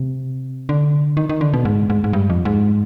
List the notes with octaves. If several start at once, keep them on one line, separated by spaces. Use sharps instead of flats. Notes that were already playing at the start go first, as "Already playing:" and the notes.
Already playing: C3
D3
D#3
D#3
D3
B2
G#2
G#2
G#2
G2
F2
G#2